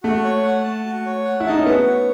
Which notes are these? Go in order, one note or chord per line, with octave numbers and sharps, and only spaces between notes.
A3 F#4
C#5
F#5
A5
F#4
C#5
F#5
E4
D#4 A5
C#4
B3 F#4
C#5